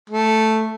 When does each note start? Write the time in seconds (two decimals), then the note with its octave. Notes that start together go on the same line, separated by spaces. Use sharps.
0.10 A3